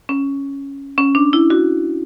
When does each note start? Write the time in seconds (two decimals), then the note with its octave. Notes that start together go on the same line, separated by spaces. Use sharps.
0.09 C#4
0.98 C#4
1.15 D4
1.33 E4
1.50 F#4